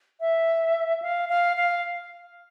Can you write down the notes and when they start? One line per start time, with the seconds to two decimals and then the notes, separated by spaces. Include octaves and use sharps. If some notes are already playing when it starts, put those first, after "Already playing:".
0.20 E5
1.02 F5
1.29 F5
1.57 F5